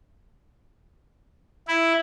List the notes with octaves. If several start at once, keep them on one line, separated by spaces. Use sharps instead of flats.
E4